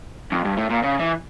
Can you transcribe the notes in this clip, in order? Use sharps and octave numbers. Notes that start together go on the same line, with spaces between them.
F2
G2
A2
A#2
C#3
E3